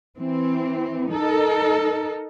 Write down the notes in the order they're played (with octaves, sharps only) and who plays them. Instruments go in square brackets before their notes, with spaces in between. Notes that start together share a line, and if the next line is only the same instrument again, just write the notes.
[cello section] E3 C4
D#4 A4 A#4